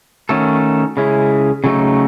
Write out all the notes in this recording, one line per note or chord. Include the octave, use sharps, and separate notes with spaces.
D#3 A3 C#4 F#4 A4
C#3 G#3 C#4 E4
C#3 F#3 A3 D#4